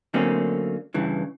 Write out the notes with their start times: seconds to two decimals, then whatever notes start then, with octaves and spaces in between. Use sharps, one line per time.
0.14 D3 F#3 A3 A#3 C4 C#4
0.94 G2 C#3 E3